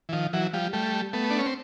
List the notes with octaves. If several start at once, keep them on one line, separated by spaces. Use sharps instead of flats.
E3
D#3 F3
E3 F#3
F3 G3
G3 A3
A3 B3
D4
C#4
C4